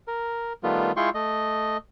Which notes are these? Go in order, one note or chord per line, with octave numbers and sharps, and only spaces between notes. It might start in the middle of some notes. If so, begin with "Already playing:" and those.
A#4
D#3 G3 A3 B3 F4
G#3 E4 F4 G5 C6 C#6
A3 D#5